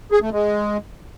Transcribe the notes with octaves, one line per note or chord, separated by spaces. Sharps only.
G#4
A3
G#3